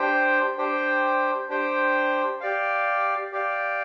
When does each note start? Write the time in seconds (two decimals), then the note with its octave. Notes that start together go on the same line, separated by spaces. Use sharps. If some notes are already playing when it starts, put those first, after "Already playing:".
Already playing: D4 G4 C5 G5
0.58 D4 G4 C5 G5
1.49 D4 G4 C5 G5
2.41 G4 D5 F5
3.32 G4 D5 F5